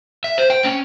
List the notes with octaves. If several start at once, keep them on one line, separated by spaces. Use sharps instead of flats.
E5
C5
G5
C#4